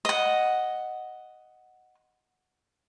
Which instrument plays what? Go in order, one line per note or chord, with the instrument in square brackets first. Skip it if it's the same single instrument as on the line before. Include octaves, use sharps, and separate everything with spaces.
[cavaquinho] D#5 F#5